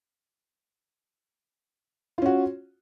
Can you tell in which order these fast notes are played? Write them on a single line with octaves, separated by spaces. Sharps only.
F4 C#4 F#4